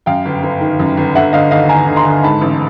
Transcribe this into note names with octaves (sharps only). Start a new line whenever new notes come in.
F#2 F5 G5
G1
G1
D#3
F#2
G1
D3 E5 F#5
D3 D#5 F5
D#2 D#5 F5
D#2 G#5 A#5
D3
A#5 C6
D3
G#2 A5 B5
A1